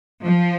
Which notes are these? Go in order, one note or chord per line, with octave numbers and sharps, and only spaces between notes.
F3